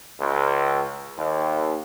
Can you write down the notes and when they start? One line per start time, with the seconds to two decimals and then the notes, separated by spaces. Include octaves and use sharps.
0.20 C#2
1.18 D#2